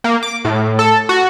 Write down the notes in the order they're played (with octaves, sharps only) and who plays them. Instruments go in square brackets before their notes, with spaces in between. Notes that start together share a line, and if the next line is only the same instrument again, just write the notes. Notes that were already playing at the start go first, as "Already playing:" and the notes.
[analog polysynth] A#3
D6
A2
A4
F#4